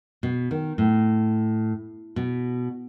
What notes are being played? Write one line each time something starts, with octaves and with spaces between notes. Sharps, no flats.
B2
D#3
A2
B2